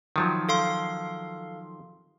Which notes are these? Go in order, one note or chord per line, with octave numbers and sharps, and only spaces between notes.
D#3 F3 F#3
A4 F5 C6